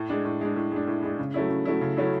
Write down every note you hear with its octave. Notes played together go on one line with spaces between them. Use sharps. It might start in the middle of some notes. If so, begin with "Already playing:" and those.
Already playing: A2
G#3 D4
A2
G#3 D4
A2
G#3 D4
A2
G#3 D4
C#3
F#3 A3 C#4 E4
C#3
F#3 A3 C#4 E4
C#3
F#3 A3 C#4 E4